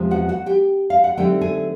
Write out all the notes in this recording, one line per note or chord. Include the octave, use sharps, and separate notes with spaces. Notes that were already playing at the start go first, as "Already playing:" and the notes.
Already playing: E2 C3 F3 G#3
F#4 F#5
F#4 F#5
G4 G5
F5
F#5
D3 F#3 A3 C4 D#4 G4 G5
G#4 G#5